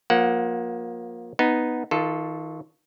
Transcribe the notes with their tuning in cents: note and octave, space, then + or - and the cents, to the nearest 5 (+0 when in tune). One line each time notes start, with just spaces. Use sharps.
F3 +35 A#3 +20 F#5 +0
B3 +0 D#4 +0
D#3 +35 F4 +0 A4 +0